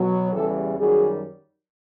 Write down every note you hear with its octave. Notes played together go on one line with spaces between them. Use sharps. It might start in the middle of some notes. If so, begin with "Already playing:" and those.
Already playing: B2 F#3
E2 C#3 E3 G3 G4 A4
F#2 D#3 G3 F#4 G#4